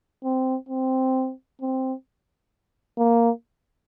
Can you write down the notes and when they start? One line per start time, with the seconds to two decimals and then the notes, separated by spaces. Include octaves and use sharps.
0.24 C4
0.69 C4
1.61 C4
2.98 A#3